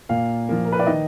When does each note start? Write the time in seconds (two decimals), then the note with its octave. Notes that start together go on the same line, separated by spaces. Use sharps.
0.09 A#2 F5
0.49 F3 A#3
0.65 A#4
0.72 B4
0.79 D5
0.87 D#3 D#5